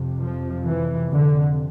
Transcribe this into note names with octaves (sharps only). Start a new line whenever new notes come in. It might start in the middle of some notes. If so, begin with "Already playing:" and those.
Already playing: F2 C3
F3
E3
D3